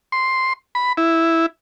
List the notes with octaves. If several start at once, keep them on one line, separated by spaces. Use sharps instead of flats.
C6
B5
E4